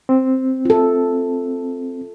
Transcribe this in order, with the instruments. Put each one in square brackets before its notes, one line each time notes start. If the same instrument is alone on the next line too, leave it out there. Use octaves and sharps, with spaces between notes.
[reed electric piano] C4
[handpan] F4 A4